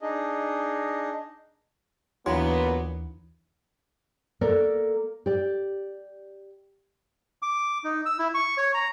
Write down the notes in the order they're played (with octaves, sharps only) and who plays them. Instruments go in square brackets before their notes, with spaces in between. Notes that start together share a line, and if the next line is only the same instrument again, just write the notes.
[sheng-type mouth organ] D4 D#4 G#4 D#5
[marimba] D#2 E3 [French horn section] A#2 B3 [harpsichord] F#3 [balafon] D4 E4
[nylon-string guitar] A#3 A4 A#4 D5
G4 D5
[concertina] D6
D#4
E6
E4
C#6
C#5
A#5